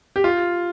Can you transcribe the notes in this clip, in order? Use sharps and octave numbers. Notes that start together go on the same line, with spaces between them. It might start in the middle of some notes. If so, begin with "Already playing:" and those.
G4
F4